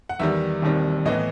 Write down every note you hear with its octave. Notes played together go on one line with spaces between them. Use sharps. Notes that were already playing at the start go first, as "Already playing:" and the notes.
F#5
E2 D#3 G3 E5
E1 D#2 D#3 G3 C4
A2 E3 B3 D#5